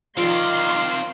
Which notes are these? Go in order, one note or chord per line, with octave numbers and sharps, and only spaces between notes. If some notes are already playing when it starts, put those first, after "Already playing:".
D#3 F3 C4 D5 F5 C6